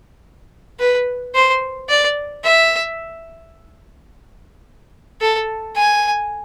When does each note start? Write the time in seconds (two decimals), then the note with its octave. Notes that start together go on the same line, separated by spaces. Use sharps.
0.79 B4
1.35 C5
1.89 D5
2.45 E5
5.21 A4
5.76 G#5